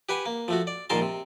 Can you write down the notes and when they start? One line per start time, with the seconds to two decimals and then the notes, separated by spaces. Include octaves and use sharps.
0.09 G4 B4 F#5 G#5
0.26 A#3
0.48 F3 A3 F#4
0.67 D5
0.90 A#1 G#2 D#3 A#4 A5 C6
1.02 C3